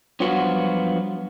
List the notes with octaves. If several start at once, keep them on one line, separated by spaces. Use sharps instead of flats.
G2 F3 F#3 B3 F4 F#4